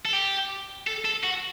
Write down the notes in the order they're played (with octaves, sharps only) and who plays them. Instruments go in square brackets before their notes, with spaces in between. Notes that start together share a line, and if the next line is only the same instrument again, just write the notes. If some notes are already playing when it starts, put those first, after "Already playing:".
[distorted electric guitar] A4
G4
A4
A4
F#4